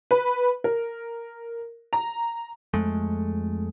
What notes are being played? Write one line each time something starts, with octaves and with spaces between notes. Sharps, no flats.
B4
A#4
A#5
F2 G#3 A3